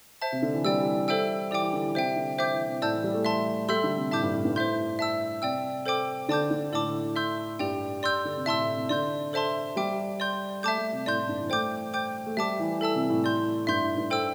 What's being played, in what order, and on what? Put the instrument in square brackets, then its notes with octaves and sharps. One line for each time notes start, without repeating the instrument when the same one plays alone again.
[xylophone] C5 E5 A5
[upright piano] C3
D3
E3
[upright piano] G3 [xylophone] D5 G5 E6
[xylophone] A4 C5 E5 G5 E6
[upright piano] E3 [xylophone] G4 D5 G5 D6
[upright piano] E3
D3
E3
[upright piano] C3 [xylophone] C5 E5 G5
[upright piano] D3
[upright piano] E3 [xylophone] C5 E5 G5 D6 G6
[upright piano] E3
C3
[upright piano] A2 [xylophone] D5 A5 E6 G6
[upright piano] E3
G3
A3
[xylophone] E5 A5 C6
[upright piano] G3 [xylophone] A4 E5 C6 E6 G6
[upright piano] D3
C3
[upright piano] A2 [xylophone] E5 A5 D6 G6
[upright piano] G2
A2
G2
[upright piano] A2 [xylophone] C5 E5 C6 G6
[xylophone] E5 A5 E6
[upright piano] C3 [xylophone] D5 G5 E6
[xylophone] A4 C5 G5 D6
[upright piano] D3 [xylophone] D5 A5 D6 G6
[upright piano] D3
[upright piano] A2 [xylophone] A4 D5 A5 D6
[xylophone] E5 C6 E6 G6
[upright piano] G2 [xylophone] G4 D5 G5
[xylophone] D5 C6 E6 G6
[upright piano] D3
C3
[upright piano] A2 [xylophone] E5 A5 C6 E6
[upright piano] A2
C3
[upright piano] D3 [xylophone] D5 C6 G6
[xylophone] A4 C5 E5 A5 C6
[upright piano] G3 [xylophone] E5 G5 D6
[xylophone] D5 C6 G6
[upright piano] A3 [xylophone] E5 A5 D6 G6
[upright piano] A3
C3
[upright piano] A2 [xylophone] D5 C6 G6
[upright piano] A2
G2
E3
[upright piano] A3 [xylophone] C5 G5 D6 G6
[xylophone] C5 G5 D6 G6
[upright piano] A3
[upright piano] G3 [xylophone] E5 A5 D6
[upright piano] E3
[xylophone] A4 E5 A5 E6
[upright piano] C3
A2
[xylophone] D5 C6 G6
[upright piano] G2 [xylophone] E5 C6 G6
[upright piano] A2
G2
[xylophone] A4 C5 G5 E6